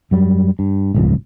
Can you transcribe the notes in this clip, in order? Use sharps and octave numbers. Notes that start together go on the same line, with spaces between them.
F#2 F#3 G3
G2
D1 G1 C#2 F3